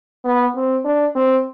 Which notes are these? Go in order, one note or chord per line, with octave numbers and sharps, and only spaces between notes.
B3
C4
D4
C4